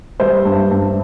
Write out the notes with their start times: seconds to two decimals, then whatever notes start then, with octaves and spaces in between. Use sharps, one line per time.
0.20 G3 C5 E5
0.45 G2
0.71 G2